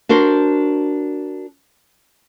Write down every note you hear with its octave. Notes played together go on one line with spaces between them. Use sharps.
D4 F#4 A#4 C5